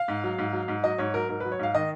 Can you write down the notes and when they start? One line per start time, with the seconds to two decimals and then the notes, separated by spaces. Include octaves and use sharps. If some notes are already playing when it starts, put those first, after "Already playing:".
Already playing: F5
0.08 G#2
0.24 F#3
0.39 G#2
0.53 F#3
0.68 G#2
0.84 F#3 D#5
0.98 G#2 C#5
1.14 F#3 A#4
1.29 G#2 A#4
1.40 F#3 B4
1.52 C#5
1.59 G#2 F5
1.74 D#3 D#5